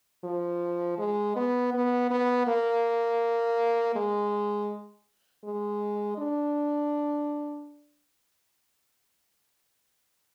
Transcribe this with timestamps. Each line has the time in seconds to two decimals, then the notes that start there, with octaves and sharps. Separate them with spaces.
0.24 F3
0.98 G#3
1.36 B3
1.73 B3
2.11 B3
2.47 A#3
3.95 G#3
5.44 G#3
6.18 D4